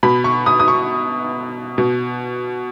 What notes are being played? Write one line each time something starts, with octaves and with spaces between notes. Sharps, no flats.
B2 B5
C#6
D#6
D#6
C#6
B2